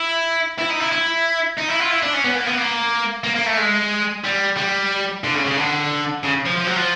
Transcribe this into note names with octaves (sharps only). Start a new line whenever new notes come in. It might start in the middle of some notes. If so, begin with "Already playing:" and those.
Already playing: E4
E4
D#4
E4
E4
D#4
E4
F4
E4
D4
C#4
B3
A#3
B3
A#3
A#3
A#3
A3
G#3
G3
G3
D3
C#3
C#3
D3
C#3
F3
F3
F#3
F3